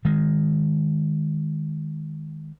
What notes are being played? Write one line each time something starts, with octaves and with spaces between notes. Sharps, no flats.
D#3 G#3